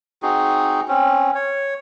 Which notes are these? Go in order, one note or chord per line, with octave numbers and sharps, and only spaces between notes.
C4 D#4 F#4 G#4
C4 C#4
C#5